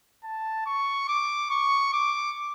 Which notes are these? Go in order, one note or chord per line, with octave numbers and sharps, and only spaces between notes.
A5
C#6
D6
C#6
D6